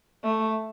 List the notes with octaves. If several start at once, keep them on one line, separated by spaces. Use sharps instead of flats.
A3